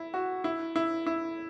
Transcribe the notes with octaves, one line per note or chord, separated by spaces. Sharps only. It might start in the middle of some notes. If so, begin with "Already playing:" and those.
Already playing: E4
F#4
E4
E4
E4